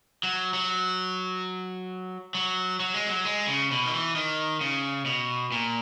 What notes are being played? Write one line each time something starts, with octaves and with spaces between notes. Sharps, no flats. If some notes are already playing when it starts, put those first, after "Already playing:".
F#3
F#3
F#3
F#3
G#3
F#3
G#3
C#3
B2
D#3
E3
D#3
C#3
B2
A#2